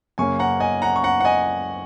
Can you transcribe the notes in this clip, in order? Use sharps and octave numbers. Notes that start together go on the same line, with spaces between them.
F#2 C#3 A#3 C#4 G#5 C#6
F#5 A#5
D#5 G#5
F#5 A#5
C#6
F#5 A#5
F#5
D#5 G#5